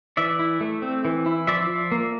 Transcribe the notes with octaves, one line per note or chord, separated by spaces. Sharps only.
E3 D5 E5
E4
A3
C4
E3
E4
F3 D5 E5
F3
A#3